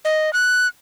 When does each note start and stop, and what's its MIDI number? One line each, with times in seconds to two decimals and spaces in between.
0.05 0.33 75
0.33 0.67 90